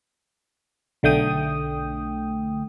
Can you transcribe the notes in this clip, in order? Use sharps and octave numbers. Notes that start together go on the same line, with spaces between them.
B1 D3 A3 G5 D#6